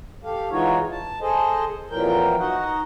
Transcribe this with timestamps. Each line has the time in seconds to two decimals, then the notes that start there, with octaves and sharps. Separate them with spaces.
0.24 G4 A4 F5
0.51 E3 G#3 D#4 F4 F#4 C#5
0.91 A5
1.21 G#4 A4 C5 D#5
1.90 F2 A#2 E3 F#3 A#4 G5
2.38 D#4 F#4 D#5 F#5